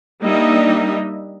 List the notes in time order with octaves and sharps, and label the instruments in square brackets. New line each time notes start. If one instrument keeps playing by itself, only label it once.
[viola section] G3 A#3 D4 D#4 D#5 E5